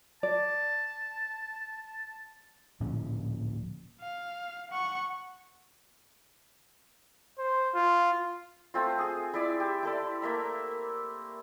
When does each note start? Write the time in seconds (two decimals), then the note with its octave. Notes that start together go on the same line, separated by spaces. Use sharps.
0.23 D5 A5
2.80 D1 A#2 F3 C#4
4.01 F5
4.71 F#5 C#6
7.39 C5
7.75 F4
8.74 A3 C4 F4
8.98 G#4 D#6
9.34 E4 D5 E5
9.60 G4
9.83 E4 A4 D5
10.22 A3 A#3 E5 A#5